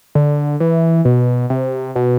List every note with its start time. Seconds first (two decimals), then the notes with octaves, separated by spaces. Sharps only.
0.15 D3
0.60 E3
1.05 B2
1.50 C3
1.96 B2